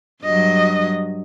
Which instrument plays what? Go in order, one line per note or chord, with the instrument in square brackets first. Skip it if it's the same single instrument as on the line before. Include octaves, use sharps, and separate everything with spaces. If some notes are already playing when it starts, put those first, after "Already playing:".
[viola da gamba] G2 F#3 [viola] D#5